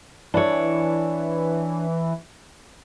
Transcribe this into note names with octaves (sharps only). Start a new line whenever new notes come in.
E3 D4 C#5